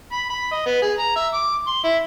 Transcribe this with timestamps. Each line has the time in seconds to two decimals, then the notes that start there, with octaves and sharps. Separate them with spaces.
0.12 B5
0.30 B5
0.52 D#5
0.66 B3
0.82 G#4
0.99 A#5
1.16 E5
1.34 D6
1.67 C6
1.84 E4